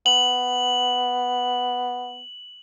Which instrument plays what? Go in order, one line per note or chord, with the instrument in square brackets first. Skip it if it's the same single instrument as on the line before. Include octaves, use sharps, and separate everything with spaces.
[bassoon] B3 [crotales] F#7